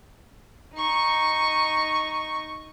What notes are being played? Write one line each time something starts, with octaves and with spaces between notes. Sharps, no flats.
D#4 C#6